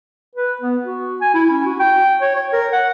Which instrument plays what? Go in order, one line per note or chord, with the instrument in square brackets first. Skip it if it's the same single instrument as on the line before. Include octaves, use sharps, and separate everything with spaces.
[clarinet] B4
B3
F#4
G#5
E4
C#4
F#4
G5
C#5
C#5
A#4
F#5